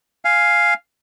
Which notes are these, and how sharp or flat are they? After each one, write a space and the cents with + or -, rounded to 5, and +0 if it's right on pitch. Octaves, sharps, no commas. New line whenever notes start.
F5 +0 G#5 +0